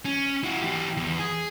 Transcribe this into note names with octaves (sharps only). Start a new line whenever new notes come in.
C#4
E4 F#4
E3 G4
E2
G#4